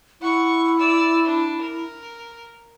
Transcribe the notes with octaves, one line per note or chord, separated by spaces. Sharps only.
E4 F#5 C#6
D5 E6
D4
A#4